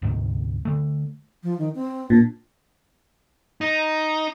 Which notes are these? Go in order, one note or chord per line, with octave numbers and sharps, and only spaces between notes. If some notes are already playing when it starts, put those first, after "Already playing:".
D2 G#2 C3
D3 A3
F3
D#3
C4
A#2 D4
D#4